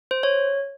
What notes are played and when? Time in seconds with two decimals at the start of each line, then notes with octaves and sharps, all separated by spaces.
0.11 C5
0.23 C#5